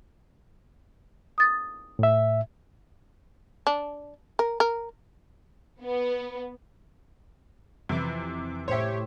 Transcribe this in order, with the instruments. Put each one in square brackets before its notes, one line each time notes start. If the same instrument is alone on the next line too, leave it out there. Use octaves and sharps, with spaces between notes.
[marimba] D#6 A6
[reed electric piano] A2 E5
[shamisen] D4
A#4
A#4
[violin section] B3
[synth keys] F2 E3 D6 [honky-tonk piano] C3
[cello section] A2 [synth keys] G4 C#5 [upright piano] C5 E5